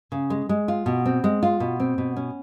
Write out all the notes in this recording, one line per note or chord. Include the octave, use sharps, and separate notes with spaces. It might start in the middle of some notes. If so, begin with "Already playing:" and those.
C#3
G#3
G#3
F4
B2
C4
G#3
F4
B2
C4
B2
C#4